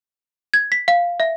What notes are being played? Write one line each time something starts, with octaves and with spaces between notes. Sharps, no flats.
G#6
B6
F5
E5